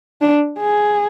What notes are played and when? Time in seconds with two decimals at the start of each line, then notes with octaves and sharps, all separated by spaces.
0.21 D4
0.59 G#4